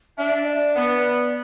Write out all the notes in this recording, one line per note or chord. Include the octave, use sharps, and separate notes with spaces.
D4 E5
D5
B3